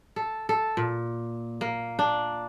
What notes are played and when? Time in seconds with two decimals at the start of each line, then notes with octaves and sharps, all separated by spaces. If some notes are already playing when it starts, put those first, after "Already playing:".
0.16 A4
0.49 A4
0.77 A#2
1.61 A#3
1.99 D4